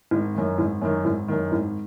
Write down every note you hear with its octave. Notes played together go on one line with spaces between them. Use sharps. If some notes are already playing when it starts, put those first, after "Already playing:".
G#1
F#2 D#3
G#1
F#2 D#3
G#1
F#2 D#3
G#1